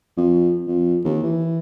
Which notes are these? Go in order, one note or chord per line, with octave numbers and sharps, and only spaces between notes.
F2
F2
D#2
E3